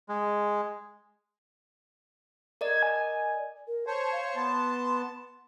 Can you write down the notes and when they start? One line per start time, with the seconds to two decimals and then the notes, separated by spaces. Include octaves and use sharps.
0.09 G#3
2.61 A#4 D5 D#5 G#6
2.83 G#5
3.67 A#4
3.87 C5 C#5 A5
4.12 F5
4.36 B3 A5 C6